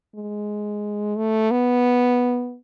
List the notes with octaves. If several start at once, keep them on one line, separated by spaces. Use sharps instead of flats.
G#3
A3
B3